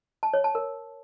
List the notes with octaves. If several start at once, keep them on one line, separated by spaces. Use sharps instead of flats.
A5
C#5
A5
A#4